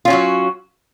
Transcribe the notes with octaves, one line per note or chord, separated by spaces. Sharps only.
F#3 C#4 F4 F#4